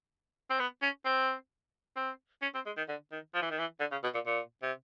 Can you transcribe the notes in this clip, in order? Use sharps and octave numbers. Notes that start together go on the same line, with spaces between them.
C4
B3
C#4
C4
C4
C#4
C4
G#3
D#3
D3
D#3
F3
E3
D#3
E3
D3
C#3
B2
A#2
A#2
C3